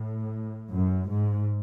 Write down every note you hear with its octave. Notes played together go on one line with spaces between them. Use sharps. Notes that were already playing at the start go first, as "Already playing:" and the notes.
Already playing: A2
F#2
G#2